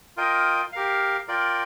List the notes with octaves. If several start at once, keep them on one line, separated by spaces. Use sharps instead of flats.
F4 A#4 D#5 G5
G4 A#4 F5
F4 A#4 D5 G5